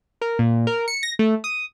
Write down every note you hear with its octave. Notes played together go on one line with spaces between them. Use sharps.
A#4
A#2
A#4
C#7
A#6
A3
D#6